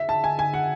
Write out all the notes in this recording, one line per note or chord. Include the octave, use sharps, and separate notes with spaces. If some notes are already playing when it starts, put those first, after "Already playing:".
Already playing: E5
A5
G#5
G#5
F#5